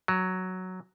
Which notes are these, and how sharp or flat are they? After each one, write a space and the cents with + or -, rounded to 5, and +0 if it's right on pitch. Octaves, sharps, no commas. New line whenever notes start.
F#3 +0